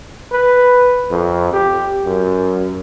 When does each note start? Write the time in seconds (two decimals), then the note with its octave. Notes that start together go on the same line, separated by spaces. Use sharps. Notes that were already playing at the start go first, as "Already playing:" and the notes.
0.32 B4
1.11 F2
1.53 G4
2.05 F#2